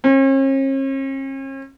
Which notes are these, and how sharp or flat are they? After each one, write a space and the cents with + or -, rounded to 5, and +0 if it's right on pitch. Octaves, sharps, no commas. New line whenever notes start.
C#4 -45